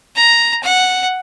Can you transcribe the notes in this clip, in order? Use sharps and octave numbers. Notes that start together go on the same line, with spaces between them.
A#5
F#5